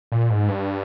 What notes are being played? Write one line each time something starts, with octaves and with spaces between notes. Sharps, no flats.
A#2
G#2
G2